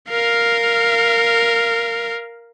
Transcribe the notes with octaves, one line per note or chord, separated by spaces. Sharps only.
A#4 F5